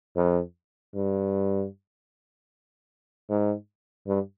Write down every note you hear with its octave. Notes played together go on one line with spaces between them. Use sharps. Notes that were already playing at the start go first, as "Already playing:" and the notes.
F2
G2
G#2
G2